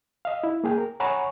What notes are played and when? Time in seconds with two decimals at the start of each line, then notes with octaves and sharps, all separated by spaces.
0.25 D#5 F5
0.44 E4
0.64 A#3 G#4 G5
0.78 A#4
1.00 C#5 F#5 G#5 A#5 B5 C#6